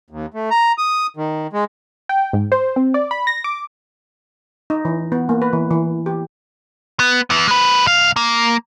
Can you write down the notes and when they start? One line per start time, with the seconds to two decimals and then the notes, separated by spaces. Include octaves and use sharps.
0.10 D#2
0.34 A3
0.51 A#5
0.78 D#6
1.17 D#3
1.53 G#3
2.09 G5
2.33 G#2
2.52 C5
2.76 C4
2.94 D5
3.11 B5
3.27 A#6
3.44 D6
4.70 D#4
4.85 E3
5.12 B3
5.29 A#3
5.42 B4
5.53 E3
5.71 E3
6.06 G4
7.00 B3
7.30 E3 B3
7.48 G#3 B4
7.86 C2 F5
8.16 A#3